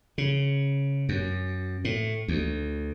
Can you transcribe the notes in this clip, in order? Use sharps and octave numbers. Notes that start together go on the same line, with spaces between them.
C#3
F#2
A2
D2